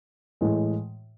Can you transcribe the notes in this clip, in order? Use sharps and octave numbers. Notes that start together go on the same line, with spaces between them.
A2 E3 G#3